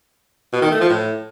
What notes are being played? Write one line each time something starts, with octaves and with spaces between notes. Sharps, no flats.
B2
D#3
A3
F3
A2